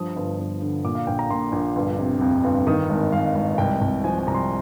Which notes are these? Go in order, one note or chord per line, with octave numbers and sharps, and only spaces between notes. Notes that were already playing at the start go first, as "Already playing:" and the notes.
Already playing: G2 F3 D#6
G1
G1
D3
A#2 D6
F5
A#1 G5
A#5
A#2 C6
A#1
G1
C3
F2
G1
D#3 D#6
G#1
G#1 F5
G#1
C2 G5
C2
F3 G#5
G#5
C2 A#5
C6